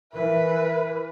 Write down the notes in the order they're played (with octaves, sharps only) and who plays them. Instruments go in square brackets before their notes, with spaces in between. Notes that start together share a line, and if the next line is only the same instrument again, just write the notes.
[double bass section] E3 [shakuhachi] A#4 [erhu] B4 [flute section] E5